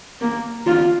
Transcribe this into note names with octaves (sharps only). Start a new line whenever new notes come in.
A#3
F4